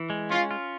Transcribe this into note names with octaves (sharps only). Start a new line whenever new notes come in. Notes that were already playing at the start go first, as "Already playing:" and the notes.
Already playing: E3
G#3
C#4 F4
F4